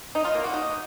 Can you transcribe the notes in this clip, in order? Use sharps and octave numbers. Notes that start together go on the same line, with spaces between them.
D#4
F4
A#3
F#4
D#4